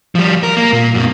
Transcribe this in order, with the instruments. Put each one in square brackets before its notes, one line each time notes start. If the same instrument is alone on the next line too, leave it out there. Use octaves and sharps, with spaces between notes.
[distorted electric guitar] F3 G3
A#4
A#3
A#2
F#2 B2